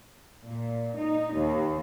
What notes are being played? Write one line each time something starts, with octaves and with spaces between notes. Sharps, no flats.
A#2
D#4
D#2